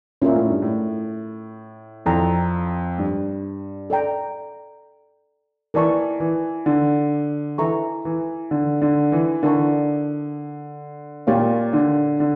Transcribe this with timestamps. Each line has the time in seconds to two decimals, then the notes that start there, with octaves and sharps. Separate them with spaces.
0.22 A#2 C#4 F4 A#4 E5
0.36 A2
0.49 G2
0.62 A2
2.06 F2 E4 A4 D5 G5 A#5
2.98 G2
3.90 A4 D5 G5 A#5
5.74 E3 A#4 D5 A5 C#6
6.20 E3
6.66 D3
7.58 E3 A4 E5 A#5 C#6
8.05 E3
8.51 D3
8.82 D3
9.12 E3
9.43 D3 E4 A#4 D5 A5 C#6
11.27 A#2 G4 A#4 C#5 F5
11.73 D3
12.20 D3